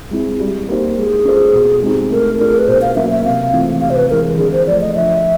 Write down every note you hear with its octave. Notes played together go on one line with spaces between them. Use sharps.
G#3 C4 E4
G3
A#3 D#4 G4 C5
G#3 G#4
C#4 F4 A4 C5
B2
G#3 C4 D#4 G4
A3 A#4
D4 F4 G#4 A#4
B4
B2 C5
F5
F#3 A#3 C#4 E5
E5
C3 F5
E3 A3 C4 F4
C3 F5
C5
B4
E3 G#3 A#4
D3 G#4
C5
F3 A3 D5
D#5
F3 E5